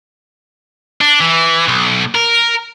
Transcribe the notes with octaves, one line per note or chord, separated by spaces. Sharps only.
D4
E3
B1
A#4